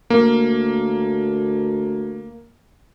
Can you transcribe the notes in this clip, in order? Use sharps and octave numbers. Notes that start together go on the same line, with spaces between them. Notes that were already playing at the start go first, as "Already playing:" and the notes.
D2 A#3